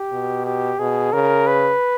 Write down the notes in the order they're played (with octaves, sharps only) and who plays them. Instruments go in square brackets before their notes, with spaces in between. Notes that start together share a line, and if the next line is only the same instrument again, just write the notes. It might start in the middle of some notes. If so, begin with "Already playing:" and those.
Already playing: [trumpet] G4
[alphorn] B2
[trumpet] G4
[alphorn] B2 [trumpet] G#4
[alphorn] C#3 [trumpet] A#4
[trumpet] B4